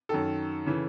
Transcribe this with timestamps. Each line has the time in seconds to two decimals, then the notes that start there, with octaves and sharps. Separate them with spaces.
0.09 F#2 D#3 A4
0.66 C#3 E3